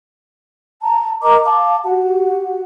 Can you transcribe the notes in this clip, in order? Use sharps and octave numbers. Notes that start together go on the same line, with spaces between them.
A5 A#5
A#4 D#5 A#5 D6
F5 A5 D6
F#4 G4 F#5